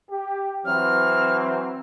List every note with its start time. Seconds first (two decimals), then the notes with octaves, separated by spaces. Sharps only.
0.10 G4
0.65 E3 F#3 C4 F6